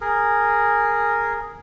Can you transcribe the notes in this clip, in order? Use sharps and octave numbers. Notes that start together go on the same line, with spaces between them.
G#4 A#4